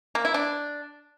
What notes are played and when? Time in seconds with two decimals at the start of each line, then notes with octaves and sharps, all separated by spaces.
0.15 A#3
0.25 E4
0.34 D4